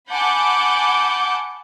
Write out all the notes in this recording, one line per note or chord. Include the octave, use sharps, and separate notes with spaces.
F#5 G#5 A5 B5 D6 G6